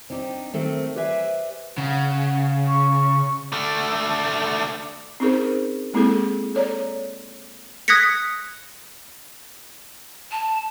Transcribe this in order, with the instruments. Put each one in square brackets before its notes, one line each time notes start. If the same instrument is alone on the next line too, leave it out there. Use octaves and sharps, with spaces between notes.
[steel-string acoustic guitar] C4 D4 D#4 G4
D#3 A3 C4
G4 B4 C5 D5 E5 G#5
[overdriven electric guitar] C#3 [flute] F#5
[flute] C#6
[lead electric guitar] D3 A3
[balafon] C4 C#4 D#4 G#4 A#4 C5
G#3 A#3 C4 E4 G#4 A4
A4 C#5 D5 A#5
[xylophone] D#6 F#6 G#6 A#6 B6 C#7
[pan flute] A5